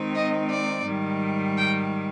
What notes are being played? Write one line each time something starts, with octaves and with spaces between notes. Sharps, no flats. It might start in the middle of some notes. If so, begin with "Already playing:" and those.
Already playing: D#3 G#3 C4 D#4
D#5
D5
G#2 D#3 G3
G5